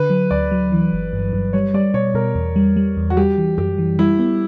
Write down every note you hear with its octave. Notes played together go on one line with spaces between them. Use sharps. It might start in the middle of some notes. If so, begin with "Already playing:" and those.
Already playing: D3 B4
F#3
D2 D5
F#3
E3
G1
G2
G2
G3 C#5
G3 D5
B2 C#5
B2 A#4
E2
G3
G3
E2
F#4
G3 G4
E3
F#2 G4
E3
G3 E4
B3